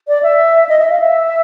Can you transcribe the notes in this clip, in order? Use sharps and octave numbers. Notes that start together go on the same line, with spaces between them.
D5
E5
D#5
E5
F5
E5